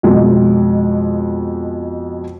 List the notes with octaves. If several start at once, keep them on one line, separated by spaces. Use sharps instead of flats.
F2 B2 G#3